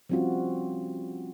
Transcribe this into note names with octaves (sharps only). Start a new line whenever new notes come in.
F3 G3 C4 C#4 F4 F#4